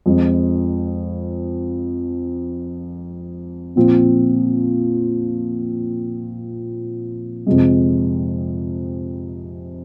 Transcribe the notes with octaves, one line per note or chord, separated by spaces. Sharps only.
F2 F3 G#3
A#2 F3 C4
F2 C3 G#3